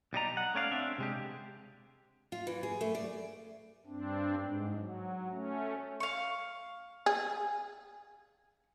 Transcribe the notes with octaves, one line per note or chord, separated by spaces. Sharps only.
B1 G3 D#5 A#5
F#5
A3 C#4 D5 F5
C4 D4 E5
C3 G#3 G4
F4
E3
G#4
A3
D5
G2 C4 D4
G#2
F#3
A3 C#4
F5 C#6
G#4